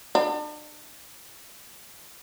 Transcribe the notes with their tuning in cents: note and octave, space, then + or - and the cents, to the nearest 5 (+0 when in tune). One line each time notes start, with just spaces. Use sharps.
D4 +40